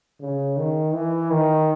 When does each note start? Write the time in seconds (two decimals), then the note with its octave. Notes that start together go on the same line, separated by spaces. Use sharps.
0.20 C#3
0.57 D#3
0.93 E3
1.30 D#3